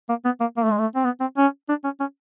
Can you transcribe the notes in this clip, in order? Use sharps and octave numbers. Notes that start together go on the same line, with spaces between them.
A#3
B3
A#3
A#3
A3
G#3
A3
C4
B3
C4
C#4
D4
C#4
C#4